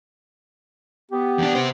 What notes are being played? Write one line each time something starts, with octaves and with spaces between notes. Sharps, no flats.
B3 G4
E2 D4
C3 C5